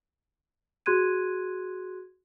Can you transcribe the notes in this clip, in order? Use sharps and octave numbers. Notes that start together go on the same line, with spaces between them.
F#4 G#4 C6 F#6 G#6 D#7